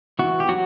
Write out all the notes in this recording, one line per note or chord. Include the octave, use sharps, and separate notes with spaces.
E3 B3 F#4
G4
F#3 F#4